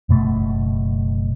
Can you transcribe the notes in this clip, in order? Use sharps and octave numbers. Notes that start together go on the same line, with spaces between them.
F#1 B2 A3